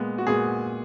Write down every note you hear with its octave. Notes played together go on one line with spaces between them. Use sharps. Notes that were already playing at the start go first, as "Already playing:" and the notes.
Already playing: A#2 G#3 B3
F#4
A#2 G#3 B3 G#4